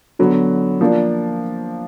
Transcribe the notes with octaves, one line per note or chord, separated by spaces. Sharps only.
D3 F#3 B3
F3 A#3 D4